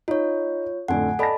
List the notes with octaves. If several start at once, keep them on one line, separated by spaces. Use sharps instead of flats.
D#4 F4 C#5
F2 A2 D3 F#5 G#5
A4 D5 D#5 A5 B5 A#6